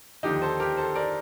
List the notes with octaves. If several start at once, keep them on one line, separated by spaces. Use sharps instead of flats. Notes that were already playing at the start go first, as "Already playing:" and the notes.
D#2 D3 F3 D#4 G4
A4 C5
G4 A#4
A4 C5
A#4 D5